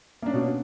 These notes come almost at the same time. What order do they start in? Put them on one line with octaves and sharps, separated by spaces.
A#3 D4 C#4 B2